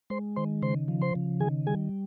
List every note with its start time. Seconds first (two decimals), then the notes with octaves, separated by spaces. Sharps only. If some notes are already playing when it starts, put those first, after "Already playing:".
0.10 G#3 C5 C6
0.36 D#3 C5 C6
0.62 C#3 C5 C6
0.88 F3
1.02 C5 C6
1.15 C#3
1.40 D#3 G#4 G#5
1.67 G3 G#4 G#5